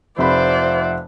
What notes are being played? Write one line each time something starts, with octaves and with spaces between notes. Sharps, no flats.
F1 F3 C5 D5 E5 F#5 B5